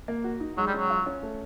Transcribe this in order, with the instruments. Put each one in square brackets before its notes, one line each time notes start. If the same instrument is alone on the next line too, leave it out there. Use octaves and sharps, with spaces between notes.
[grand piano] A#3
F#4
D#4
[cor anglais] F#3 [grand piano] G#3
[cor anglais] G3
[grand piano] C#4
[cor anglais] F#3
[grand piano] F4
C#4
A3